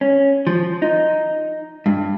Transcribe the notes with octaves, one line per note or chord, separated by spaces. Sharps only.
C#4
F3
D#4
G2